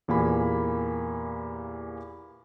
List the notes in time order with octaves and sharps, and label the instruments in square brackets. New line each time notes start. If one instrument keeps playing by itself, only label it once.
[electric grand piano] E2 A#2 A#3 G4 G#5 B5